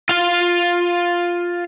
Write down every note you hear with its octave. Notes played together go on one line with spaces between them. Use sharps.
F4 F5